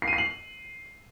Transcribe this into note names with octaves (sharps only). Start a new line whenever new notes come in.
C7
D#7
C7
F#7